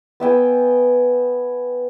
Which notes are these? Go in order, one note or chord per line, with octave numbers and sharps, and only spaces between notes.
B3 E5 G5 G#5